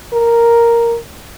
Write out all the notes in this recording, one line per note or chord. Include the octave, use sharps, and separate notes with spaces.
A#4